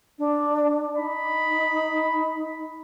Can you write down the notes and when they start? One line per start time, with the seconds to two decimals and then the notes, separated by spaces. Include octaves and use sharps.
0.19 D4
0.97 D#4 B5